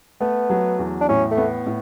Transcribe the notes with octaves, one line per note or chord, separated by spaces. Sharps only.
A3 B3
F#3
E2
D4
A2 C#4
A3
B3
A2